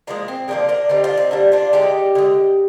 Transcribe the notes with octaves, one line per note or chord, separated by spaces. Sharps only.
D3 F3 G#3 A#3
C4
D3 F3 G#3 A#3 D4
A#3 D4
D3 G3 C4 D#4
D4 F4
C4 D#4
D3 G3 A#3 D4
D4 F4
D3 G#3 D#4 G4
D3 G#3